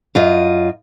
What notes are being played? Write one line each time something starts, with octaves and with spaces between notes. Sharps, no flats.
F#2 F4 D#5